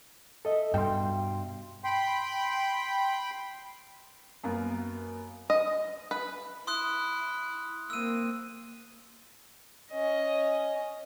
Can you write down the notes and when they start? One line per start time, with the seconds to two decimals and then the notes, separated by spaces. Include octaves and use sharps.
0.45 A4 D#5 E5
0.74 G2 B2 G5 C6
1.84 G5 B5 C6
4.44 F#2 A#3 B3
5.50 D#5
6.11 B4
6.67 E4 C6 D#6 F#6
7.90 A#3 C4 E6 D#7
9.91 C#4 D#5